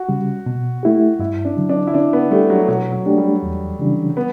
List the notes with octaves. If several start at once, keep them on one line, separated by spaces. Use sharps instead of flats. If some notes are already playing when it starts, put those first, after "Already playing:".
Already playing: F#4
C#3 G3
B2
A3 E4 G4
G2 E4
D4
D3 F#3
D4
E4
D3 D4
B3
G3 A3 D4 G4
F#3
B2 F#3
F#3
A3 D4 G4
G3
E2
C#3 E3 G3 D4
B3